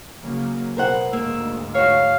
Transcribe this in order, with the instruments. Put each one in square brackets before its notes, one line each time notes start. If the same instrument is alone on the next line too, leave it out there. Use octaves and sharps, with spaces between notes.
[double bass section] C#3 F#3 A#3
[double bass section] B2 [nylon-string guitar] A#4 C5 F#5
[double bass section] D2 G#2 [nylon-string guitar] A#3 [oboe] E6
[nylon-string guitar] F#4 C#5 [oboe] F5